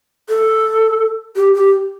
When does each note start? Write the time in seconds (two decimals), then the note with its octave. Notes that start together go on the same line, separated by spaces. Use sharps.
0.29 A4
1.36 G4
1.55 G4